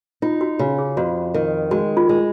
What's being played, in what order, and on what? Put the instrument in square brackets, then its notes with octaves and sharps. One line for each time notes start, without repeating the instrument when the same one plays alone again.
[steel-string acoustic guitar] D#4 [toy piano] F4
[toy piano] F#4
[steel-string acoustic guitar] C#3 [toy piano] F#4
[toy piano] G#4
[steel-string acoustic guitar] F2 [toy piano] F#4
[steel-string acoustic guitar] D#3
[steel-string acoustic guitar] G#3 [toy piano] F#4
[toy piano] F4
[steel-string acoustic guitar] G#3